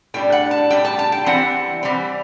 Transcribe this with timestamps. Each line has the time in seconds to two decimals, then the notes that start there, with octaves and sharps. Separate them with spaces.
0.14 A2 G3 D4 G5
0.32 F#5
0.51 A5
0.70 A2 G3 D4 G5
0.85 A5
0.99 A5
1.12 G5
1.26 E3 G3 C4 F#5
1.83 E3 G3 C4